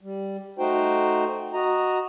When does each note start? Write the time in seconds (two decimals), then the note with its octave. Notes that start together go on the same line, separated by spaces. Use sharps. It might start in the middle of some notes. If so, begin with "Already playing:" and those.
0.01 G3
0.59 A3 D#4 F#4 C5 G5
1.54 F#4 D#5 A#5